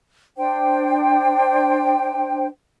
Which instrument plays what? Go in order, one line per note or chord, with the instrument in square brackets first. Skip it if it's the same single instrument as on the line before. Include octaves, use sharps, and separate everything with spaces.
[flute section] D4 C5 G5